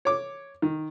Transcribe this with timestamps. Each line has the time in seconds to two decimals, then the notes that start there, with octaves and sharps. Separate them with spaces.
0.05 C#5 D6
0.62 D#3